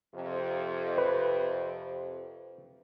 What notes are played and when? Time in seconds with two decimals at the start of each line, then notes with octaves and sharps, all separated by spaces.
0.14 F2 C3
0.98 B4